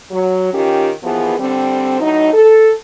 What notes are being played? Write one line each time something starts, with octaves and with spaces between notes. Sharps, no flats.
F#3
D#3 C#4 F4 G4
D#2 E3 F3 B3 G#4
D3 G3 C4
A2 F#3 D#4
A4